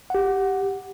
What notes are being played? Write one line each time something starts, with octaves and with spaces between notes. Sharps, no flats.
G4 F#5